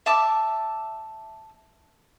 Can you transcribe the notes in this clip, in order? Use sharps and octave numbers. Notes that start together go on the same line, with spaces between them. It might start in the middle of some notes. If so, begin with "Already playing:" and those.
E5 A5 D6